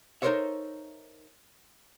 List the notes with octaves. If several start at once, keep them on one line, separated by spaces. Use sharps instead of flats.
D#4 A4 A#4 C5 C#5 E5